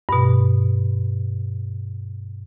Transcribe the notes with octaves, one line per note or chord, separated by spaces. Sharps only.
G2 B2